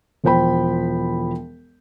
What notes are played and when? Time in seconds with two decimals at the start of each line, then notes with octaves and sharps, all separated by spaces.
0.24 E1 F3 C5 G5 B5